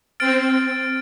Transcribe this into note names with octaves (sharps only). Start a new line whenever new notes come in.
C4 F6 A6 D7